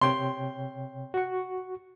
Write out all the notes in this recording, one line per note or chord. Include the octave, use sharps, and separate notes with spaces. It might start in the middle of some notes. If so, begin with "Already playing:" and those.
C3 C#5 G5 C6
F#4 C#6